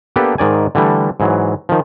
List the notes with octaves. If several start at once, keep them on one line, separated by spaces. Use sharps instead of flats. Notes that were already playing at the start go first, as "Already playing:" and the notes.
A#3 B3 D4 G4 A4 B4
G#2 D#3 D5 G#5
D3 E3 G3 A3
G#2 E3 F#3
D#3 F3